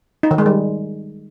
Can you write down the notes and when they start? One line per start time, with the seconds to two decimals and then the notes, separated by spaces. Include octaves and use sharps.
0.23 D#4
0.31 D#3
0.38 G#3
0.46 G3